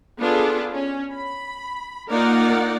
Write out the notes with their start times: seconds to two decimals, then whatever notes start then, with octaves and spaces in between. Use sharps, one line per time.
0.20 B3 D4 F4 G#4 A4
0.72 C#4
1.12 B5
2.10 A#3 D#4 F4 A#4 D5 F#5